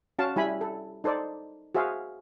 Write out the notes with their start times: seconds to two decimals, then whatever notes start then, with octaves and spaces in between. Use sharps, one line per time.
0.19 C#4 F#4 F5 A5
0.36 G3 E4 G#5 B5
0.61 A4
1.04 D#4 A4 C5 D5
1.75 F#4 G#4 C5 E5 F5